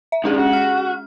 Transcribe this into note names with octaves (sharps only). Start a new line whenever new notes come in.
E5
D#3 G#3 C#4 D4 G#4
F#4
F6